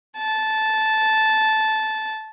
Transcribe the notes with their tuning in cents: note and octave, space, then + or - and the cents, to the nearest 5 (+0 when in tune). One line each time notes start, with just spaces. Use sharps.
A5 -10